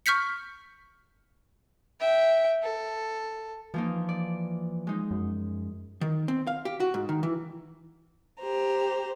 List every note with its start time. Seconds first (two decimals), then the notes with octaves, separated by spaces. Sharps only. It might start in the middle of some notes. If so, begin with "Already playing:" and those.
0.06 C#6 F6 G6 B6 C#7
2.00 E5 G5
2.62 A4
3.74 E3 F3 A#3 D#4
4.09 D5
4.87 G#3 D#4
5.11 F#2
6.01 D#3
6.28 C4
6.47 F5
6.65 G4
6.80 F#4
6.94 G#2
7.09 D#3
7.23 E3
8.41 G4 C5 A#5